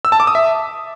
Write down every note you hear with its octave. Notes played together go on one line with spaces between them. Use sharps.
E6
A5
D6
D#6
E5